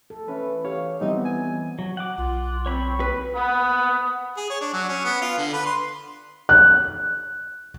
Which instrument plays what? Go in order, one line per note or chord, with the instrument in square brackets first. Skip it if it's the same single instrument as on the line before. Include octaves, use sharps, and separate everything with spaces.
[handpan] A4
[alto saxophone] E3 [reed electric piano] C#4 B4
[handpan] G4 [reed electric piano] C#5 F5
[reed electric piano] E3 G3 C4 [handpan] B3 [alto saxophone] D#4
[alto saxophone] G#5
[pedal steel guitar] F#3
F#5 D6
[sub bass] B1 [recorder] F4
[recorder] C4 [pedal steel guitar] C#5 B5 C#6
[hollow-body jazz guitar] B4
[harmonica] F#5 B5 D#6
G#4
C#5
D4
F#3
C#4
B3
F4
D3
B4
C6
[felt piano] F#6